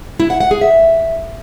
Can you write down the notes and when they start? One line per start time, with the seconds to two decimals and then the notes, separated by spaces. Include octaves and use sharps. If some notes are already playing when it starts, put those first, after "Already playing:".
0.20 E4
0.30 F#5
0.40 F#5
0.51 G#4
0.61 E5